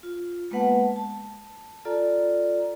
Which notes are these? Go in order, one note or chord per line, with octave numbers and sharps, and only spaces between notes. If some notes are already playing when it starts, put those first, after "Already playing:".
F4
G#3 A#3 B3 B4 F#5 A5
A5
F4 A4 D5 A#5